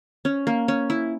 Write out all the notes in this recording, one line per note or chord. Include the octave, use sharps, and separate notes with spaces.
C#4
A#3
C#4
E4